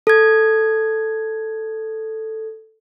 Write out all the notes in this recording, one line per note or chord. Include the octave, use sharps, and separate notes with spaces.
A4 G#6